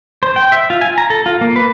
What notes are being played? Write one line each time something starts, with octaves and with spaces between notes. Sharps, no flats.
C5
G5
E5
F4
G#5
A#5
A4
F4
A#3
B4